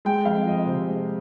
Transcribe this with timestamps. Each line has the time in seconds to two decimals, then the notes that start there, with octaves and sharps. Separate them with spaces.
0.05 G#3 G5
0.25 F2 F5
0.46 F3 D#5
0.66 C3 C5
0.88 G#3